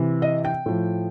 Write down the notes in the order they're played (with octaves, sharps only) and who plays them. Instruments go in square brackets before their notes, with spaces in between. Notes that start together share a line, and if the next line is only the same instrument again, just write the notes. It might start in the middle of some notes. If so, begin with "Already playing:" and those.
Already playing: [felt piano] C3 E3
D#5
G5
A2 F3